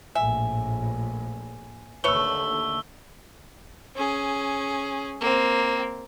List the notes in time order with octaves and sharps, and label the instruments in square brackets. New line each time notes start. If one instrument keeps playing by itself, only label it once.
[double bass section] A#1 A2 [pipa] E5 [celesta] G#5
[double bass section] D#2 D3 [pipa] A3 B4 C#5 [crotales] E6 G7
[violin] C#4 G#4
A#3 C4